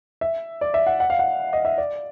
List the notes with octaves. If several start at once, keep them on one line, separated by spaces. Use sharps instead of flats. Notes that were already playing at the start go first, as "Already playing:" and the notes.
E5
D5
E5
F#5
F#5
F5
F#5
D#5
E5
D5